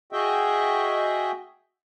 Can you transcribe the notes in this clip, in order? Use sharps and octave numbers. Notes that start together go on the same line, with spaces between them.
F#4 G#4 D#5 E5 G5